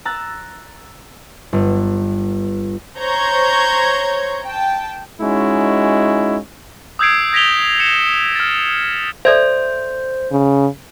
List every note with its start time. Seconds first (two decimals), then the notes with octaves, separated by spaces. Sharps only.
0.05 A#5 E6 F#6 A6
1.53 G1
2.98 C5 C#5 A#5 C#6 G6 G#6
4.45 G5 A5
5.21 G#3 C#4 D#4 E4 F#4
6.99 D#6 E6 G6 G#6 C7 D7
7.33 G#6 A#6 B6 D7 F7 G7
7.79 C7 C#7 E7 F7
8.35 F6 A6
9.25 A4 C5 D5 E5
10.32 C#3